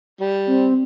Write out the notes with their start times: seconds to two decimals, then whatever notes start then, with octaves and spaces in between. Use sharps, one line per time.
0.21 G3
0.47 C4